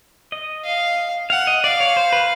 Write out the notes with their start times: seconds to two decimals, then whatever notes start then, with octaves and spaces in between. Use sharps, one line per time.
0.32 D#5
0.64 F5
1.30 F5 F#5
1.47 D#5
1.63 D5 F5
1.80 C#5
1.97 C5
2.12 B4